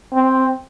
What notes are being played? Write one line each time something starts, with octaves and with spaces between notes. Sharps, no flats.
C4